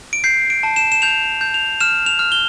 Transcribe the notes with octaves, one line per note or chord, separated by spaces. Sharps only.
D7
G6 C7
D7
A5
E7
E7
G6 F7
G6
F7
F6 E7
F7
F6
G7